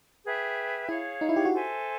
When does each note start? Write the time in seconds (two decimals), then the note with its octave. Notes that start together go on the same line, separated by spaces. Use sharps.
0.24 G#4 B4 E5 G5
0.88 E4 G#4 C#5 F5
1.21 D#4
1.29 E4
1.36 G4
1.45 F#4
1.53 A4 C5 E5 G#5